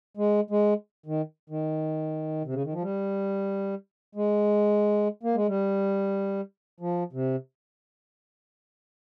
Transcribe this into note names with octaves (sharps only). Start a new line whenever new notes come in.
G#3
G#3
D#3
D#3
C3
C#3
D#3
F3
G3
G#3
A#3
G#3
G3
F3
C3